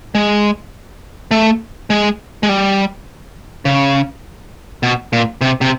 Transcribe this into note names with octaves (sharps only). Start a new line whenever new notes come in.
G#3
A3
G#3
G#3
G3
C#3
B2
A#2
C3
C3